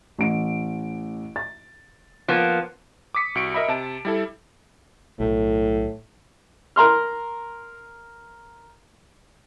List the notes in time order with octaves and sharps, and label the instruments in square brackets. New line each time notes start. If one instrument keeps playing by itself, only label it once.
[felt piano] A1 D7
A6
[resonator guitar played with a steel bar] F3 A#3 B3
[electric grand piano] D6 D#6 B6 C#7
C2 F#4 C#7 D7
A#4 D#5 E5 B5
C3 A5 D7
G3 E4 A4
[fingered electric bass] B1 [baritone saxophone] A2
[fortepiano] A#4 A#5 C6 F6